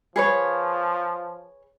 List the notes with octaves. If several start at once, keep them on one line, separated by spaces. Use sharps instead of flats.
F3 G#4 B4 C#5